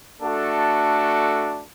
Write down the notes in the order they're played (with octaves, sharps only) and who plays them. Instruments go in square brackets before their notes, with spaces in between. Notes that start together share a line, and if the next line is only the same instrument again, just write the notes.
[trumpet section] A3 D4 F#4 A4